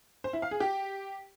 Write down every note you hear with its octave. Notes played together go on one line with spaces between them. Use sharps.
C5
E4
F5
G#4
G4